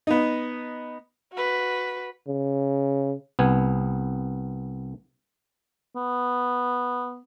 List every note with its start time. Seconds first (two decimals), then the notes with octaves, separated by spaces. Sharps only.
0.07 B3 D#4
1.33 F#4 B4
2.28 C#3
3.39 C2 B3 G#5
5.95 B3